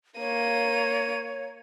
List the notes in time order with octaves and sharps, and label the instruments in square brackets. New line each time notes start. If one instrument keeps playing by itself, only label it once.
[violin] A#3 D#7 [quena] C#5